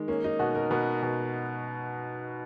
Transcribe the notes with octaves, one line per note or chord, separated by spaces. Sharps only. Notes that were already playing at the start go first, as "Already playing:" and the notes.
Already playing: D#3 G#3
A#3 C#4
D#4
B2 F#4
A#4
B2 B4
B2